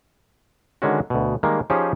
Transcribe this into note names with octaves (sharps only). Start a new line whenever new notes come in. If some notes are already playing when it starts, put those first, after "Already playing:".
D3 D#3 G#3 C#4 F#4
D2 B2
D#3 G3 G#3 A#3
F3 C#4 D#4 G4 G#4 C5